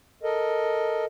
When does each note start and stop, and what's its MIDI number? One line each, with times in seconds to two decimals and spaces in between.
0.23 1.05 69
0.23 1.05 70
0.23 1.05 75